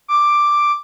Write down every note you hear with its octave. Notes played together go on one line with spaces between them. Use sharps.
D6